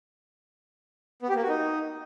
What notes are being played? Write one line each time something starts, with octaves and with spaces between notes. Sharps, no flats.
B3
G4
A#3
F#4
D#4